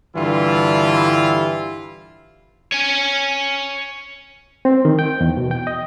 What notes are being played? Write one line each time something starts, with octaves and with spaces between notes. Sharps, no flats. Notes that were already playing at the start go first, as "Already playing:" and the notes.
G2 D3 E3 G3 E4 F4
C#5 G#5
C4
D#3
G5
E2
B2
G5
D#5